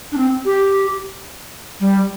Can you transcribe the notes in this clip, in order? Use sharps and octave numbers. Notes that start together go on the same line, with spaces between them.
D4
C4
G4
G3